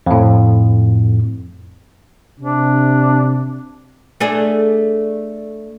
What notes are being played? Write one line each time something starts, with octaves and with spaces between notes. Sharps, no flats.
F2 A2
C3 D4
A3 D4 G#4